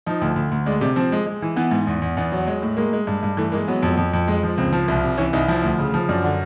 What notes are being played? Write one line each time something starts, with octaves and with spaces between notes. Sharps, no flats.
F3 D#4
D2
D2
D2
G#3 D4
C3 D4
F3 C4
G#3
G#3
E3
E3 B3
G#2
E2
E2
E2 B3
F#3
G#3
A2
G#3 A#3
G#3
G2
G2
E3 A3
G#3 A#3
F#3 B3
F2
F2
F2
G#3
F3
C#2 C4
F3
C2
C3
E3 C#4
C2 D#4
F3 E4
D2
C#3
F3
F#2 D4
D3